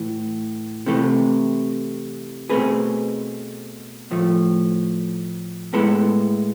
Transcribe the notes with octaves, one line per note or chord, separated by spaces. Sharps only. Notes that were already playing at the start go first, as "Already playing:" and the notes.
Already playing: A2 E3
C3 E3 A3
B2 A3 C4 G#4 B4
A2 F3 A3
A2 G#3 B3 E4 A4